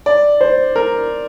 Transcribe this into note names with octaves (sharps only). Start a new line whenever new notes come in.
D5
C5
A#4